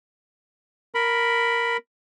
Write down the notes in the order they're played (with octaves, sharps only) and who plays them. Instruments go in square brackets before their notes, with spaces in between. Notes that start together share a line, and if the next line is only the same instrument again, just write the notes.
[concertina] A#4 B5